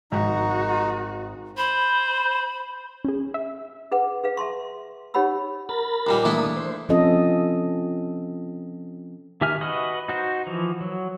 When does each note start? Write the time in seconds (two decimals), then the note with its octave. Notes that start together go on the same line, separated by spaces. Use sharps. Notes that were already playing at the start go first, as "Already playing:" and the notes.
0.12 G#1 G#3 D#4 F#4
1.58 C5 B5
3.05 C#4 G#4
3.34 E5
3.92 G#4 B4 F#5
4.24 G#4 B4 F5
4.37 E5 A5 C6 C#6
5.14 D#4 G4 C#5 F#5 B5 E6
5.69 A#4 B5 A6
6.07 D#2 A#2 G3
6.25 E3 A3 A#3 D4 E4 D#6
6.57 C5
6.89 F3 C4 C#4 F4 A4 D#5
9.41 D#3 G4 E5 G#5 F6
9.61 F#4 B4 D#5
10.08 D#4 F#4 C5
10.47 E3 F3
10.81 F#3